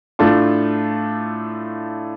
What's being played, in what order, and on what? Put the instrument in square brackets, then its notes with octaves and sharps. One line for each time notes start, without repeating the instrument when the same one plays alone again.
[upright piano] A2 A3 D4 F4